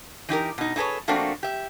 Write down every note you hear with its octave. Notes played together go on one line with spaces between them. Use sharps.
E3 D#4 G4 A#4
B2 D#4
D#4 E4 G#4 A4 B4 C#5
F3 A3 A#3 C4 D4 F#4
G4 E5